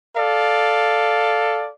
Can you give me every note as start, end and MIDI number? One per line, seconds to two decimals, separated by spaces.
0.16 1.70 69
0.16 1.70 74
0.16 1.70 77